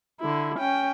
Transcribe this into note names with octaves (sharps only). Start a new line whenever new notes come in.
D3 E4
C#4 G5